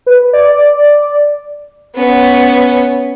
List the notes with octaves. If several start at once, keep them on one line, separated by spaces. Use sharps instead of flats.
B4
D5
B3 C#4